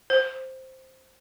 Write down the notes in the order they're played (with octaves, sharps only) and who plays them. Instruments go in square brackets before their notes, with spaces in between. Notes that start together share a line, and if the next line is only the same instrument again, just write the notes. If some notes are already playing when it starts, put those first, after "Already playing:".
[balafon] C5